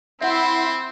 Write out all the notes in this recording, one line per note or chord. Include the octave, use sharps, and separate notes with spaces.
C4 E4 E5 F#5 C6